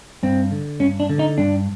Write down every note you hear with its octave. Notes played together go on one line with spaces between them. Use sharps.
G2 C4
D3
G2 C#4
D4
D3
D#4
G2 D4